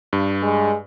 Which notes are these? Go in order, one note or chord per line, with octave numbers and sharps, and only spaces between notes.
G2
G#3